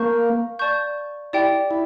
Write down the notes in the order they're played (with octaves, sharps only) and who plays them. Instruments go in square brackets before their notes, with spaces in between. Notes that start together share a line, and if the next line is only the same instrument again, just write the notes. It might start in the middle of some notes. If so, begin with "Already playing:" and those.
Already playing: [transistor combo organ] A#3 [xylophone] F5 A5 C#6 G6
[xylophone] D5 A5 C#6 G6
[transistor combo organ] E4 [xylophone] G4 D5 G5
[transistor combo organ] E4